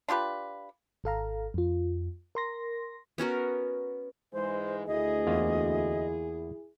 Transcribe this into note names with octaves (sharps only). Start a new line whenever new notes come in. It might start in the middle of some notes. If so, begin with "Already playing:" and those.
D4 F4 G4 B4
G#1 A4 F5 A#5
F2 F4
A#4 C6 A#6
B3 C#4 F#4 A#4
G#2 E3 G#3 C5
D2 E4 G#4 D#5
E2 A#3 F4